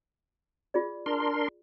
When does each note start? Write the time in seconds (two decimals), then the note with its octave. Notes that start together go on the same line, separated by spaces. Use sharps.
0.74 F4 G#4 D5
1.06 D4 A#4 C6